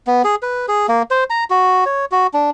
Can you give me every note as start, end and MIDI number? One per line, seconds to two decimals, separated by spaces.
0.07 0.22 59
0.24 0.35 68
0.42 0.66 71
0.68 0.87 68
0.89 1.02 58
1.11 1.24 72
1.30 1.44 82
1.50 1.85 66
1.86 2.05 73
2.12 2.27 66
2.34 2.50 62